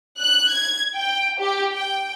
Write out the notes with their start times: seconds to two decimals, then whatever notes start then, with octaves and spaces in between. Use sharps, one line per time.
0.20 F#6
0.53 G#6
0.96 G5
1.40 G4
1.73 G5